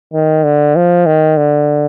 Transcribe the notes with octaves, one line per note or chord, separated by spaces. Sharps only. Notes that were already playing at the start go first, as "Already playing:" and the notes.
D#3
D3
F3
D#3
D3